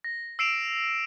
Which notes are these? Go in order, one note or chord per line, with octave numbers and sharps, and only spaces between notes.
A#6
E6 C7 D7 E7 F7